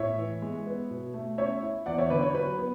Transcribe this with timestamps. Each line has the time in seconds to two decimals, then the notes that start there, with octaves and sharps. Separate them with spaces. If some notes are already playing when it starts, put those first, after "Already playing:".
Already playing: A2 C#5 E5
0.18 E3
0.42 G#3
0.66 B3
0.90 B2
1.14 A3
1.38 C#4 C#5 E5
1.62 E4
1.86 E2 D5 F#5
1.98 C#5 E5
2.10 D3 B4 D5
2.23 C#5
2.34 F#3 B4
2.58 B3